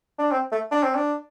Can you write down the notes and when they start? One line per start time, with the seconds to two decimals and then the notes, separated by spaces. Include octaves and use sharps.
0.18 D4
0.32 C4
0.52 A3
0.71 D4
0.83 C4
0.95 D4